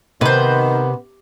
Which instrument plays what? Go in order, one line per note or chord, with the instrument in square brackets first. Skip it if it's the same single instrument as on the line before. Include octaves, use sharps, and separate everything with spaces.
[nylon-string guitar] C3 [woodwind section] D#3 [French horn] B3 [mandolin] B4 C5